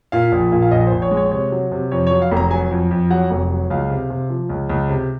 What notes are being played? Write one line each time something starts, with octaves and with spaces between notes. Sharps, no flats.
A#2 F5
A#1
A#2
F5
A#1 D#5
C5
A#1
C#5
G#3
C#5
C3 C#5
F#3
C3
F2 C#5
C#5
F#3
F5
F1
A#5
F#3 G#5
F2
F2
F#3 F#5
F1
F#3
C#2 F5
C3
C3
F3
C#2
C#2
C3